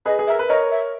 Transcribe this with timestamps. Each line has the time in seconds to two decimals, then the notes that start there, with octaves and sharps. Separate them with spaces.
0.05 G#4 B4 D#5
0.19 G#4
0.27 A#4 E5
0.39 B4
0.49 A#4 C#5 D#5
0.71 E5